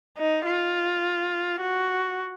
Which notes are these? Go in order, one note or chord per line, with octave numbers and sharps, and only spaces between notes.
D#4
F4
F#4